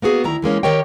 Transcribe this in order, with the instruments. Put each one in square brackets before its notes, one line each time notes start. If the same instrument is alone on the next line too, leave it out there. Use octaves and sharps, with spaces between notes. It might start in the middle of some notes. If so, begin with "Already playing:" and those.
[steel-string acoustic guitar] A#3 B3 F#4 G#4
D2 D#3 E4 A#5
E3 G#3 A#3 C#4
D#3 G4 A#4 C#5 D#5 G5